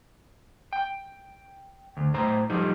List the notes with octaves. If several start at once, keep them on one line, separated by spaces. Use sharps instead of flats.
G5
D2
A2 C5 A#5
F3 G3 D#4 A4